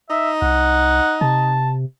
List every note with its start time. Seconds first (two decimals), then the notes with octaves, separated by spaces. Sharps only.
0.10 D#4 E5
0.42 C2 F#5
1.21 C3 A5